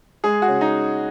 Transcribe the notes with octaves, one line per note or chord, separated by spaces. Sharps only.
G#3 G#4
F#4
C#3
D#4